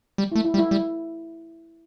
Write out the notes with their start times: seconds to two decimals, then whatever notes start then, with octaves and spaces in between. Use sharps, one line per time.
0.18 G3
0.32 A3 E4
0.45 E4
0.54 G3
0.58 E4
0.71 G3